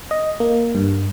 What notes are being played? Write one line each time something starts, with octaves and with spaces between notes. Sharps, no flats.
D#5
A#3
G2